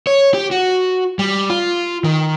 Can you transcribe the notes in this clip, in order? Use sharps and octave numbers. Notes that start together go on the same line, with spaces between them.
C#5
G4
F#4
G3
F4
D#3